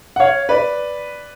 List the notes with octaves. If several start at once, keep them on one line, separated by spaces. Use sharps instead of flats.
F#5
C#5 F5
B4 D5